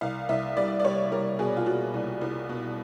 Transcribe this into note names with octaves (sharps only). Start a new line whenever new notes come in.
C2 F5
C2 E5
G3 D5
D5
G3 C#5
G3 A#4
B2 G#4
F4
B2 F#4
C2
C2
B2